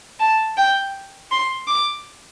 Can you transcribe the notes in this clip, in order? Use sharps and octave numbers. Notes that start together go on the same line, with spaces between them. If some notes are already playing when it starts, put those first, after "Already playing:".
A5
G5
C6
D6